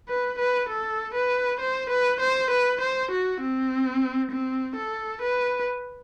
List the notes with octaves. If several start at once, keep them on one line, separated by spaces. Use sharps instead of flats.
B4
B4
A4
B4
C5
B4
C5
B4
C5
F#4
C4
C4
A4
B4